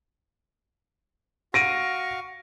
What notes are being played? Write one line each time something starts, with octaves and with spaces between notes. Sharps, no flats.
F#4 F5 C#6 A#6 D7 D#7